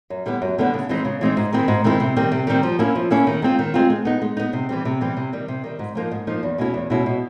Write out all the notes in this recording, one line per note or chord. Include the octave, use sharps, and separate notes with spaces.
F#2
D3 G3 B3 E4
F#2
D3 G3 B3 E4
C#3
E3 G#3 C4 D#4
C#3
E3 G#3 C4 D#4
G#2
D#3 G#3 C4 E4
G#2
D#3 G#3 C4 E4
C3
D#3 G3 C4
C3
D#3 G3 C4
F3
A#3 C#4 E4
F3
A#3 C#4 E4
D#3
G#3 C4 F4
D#3
G#3 C4 F4
G#3
B3 D#4
G#3
B3 D#4
C3
E3 G3 C4
C3
E3 G3 C4
C3
D#3 G3
C3
D#3 G3
G#2
F3 A#3 D#4
G#2
F3 A#3 D#4
E2
B2 G#3 C#4 E4
E2
B2 G#3 C#4 E4
B2